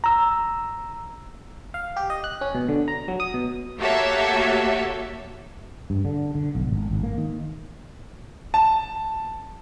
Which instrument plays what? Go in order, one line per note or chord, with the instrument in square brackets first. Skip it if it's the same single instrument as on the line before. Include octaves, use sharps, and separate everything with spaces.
[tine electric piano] A#5 E6
[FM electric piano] F5
G4
D#5
F#6
C#4
B2
D3
A#5
F#3
D#6
B2
[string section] A#3 F#4 G4 A4 C#5 E5
[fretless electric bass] G2
D3
D3
B1
G#1
G#1
A#3
D#3
[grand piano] A5